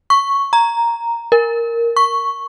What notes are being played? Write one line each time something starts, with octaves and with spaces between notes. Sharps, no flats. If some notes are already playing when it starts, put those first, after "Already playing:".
C#6
A#5
A#4
C#6